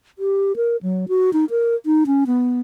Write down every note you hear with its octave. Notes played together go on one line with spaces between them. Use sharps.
G4
A#4
F#3
F#4
D#4
A#4
D#4
C#4
B3